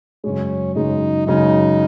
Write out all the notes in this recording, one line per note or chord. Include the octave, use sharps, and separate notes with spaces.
F#2 C#3 G#3 C#4
F#2 C#3 G#3 D#4
F#2 C#3 G#3 D#4